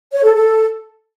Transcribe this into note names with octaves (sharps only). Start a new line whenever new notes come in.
C#5
A4
A4